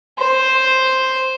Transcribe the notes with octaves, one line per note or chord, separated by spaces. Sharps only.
C5